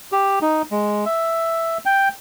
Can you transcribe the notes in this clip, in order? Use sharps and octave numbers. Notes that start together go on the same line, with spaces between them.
G4
D#4
G#3
E5
G5